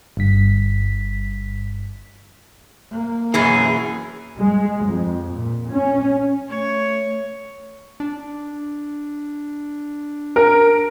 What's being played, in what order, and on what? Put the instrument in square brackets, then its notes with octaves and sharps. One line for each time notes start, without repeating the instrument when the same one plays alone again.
[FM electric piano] G1 G2 B6
[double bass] A#3
[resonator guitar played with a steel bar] F#2 B2 E3 [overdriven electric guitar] G#4
[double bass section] G#3
F2
A#2
C#4
[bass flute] A3 [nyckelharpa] C#5
[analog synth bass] D4
[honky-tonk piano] A#4